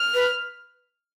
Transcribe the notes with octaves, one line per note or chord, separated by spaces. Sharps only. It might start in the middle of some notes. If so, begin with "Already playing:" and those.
Already playing: F6
B4